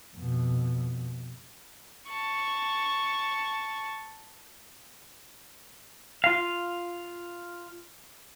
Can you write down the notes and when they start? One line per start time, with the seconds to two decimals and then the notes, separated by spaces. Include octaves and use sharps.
0.17 F2 B2
2.09 A5 C#6
6.24 F4 F5